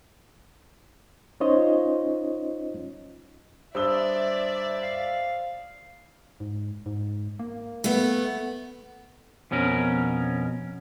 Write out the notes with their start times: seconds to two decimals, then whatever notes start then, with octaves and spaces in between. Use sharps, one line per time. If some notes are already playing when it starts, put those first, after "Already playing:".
1.40 C#4 D#4 F4 C5 C#5 D#5
3.75 G2 C5 D5 E5 D#6 E6 G7
4.83 F5
6.40 G#2
6.86 G#2
7.39 A#3
7.84 A3 B3
9.51 F2 B2 C#4 A#4